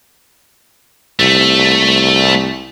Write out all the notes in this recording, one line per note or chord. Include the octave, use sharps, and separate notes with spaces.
C2 A3